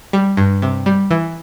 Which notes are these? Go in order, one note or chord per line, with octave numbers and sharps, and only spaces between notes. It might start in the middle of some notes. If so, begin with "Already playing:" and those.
G3
G2
C3
G3
E3